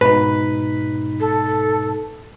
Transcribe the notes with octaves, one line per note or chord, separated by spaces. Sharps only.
G#2 B2 D#4 B4
A4